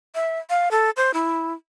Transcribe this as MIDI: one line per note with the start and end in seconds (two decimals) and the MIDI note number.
0.15 0.39 76
0.50 0.69 77
0.71 0.90 69
0.97 1.11 72
1.14 1.53 64